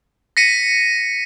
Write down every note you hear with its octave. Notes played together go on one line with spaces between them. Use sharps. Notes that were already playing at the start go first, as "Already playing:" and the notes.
A#6 B6 C#7 D#7